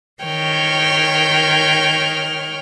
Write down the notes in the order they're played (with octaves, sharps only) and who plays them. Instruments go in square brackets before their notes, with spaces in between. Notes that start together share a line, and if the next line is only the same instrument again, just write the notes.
[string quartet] D#3 C#5 G5 F6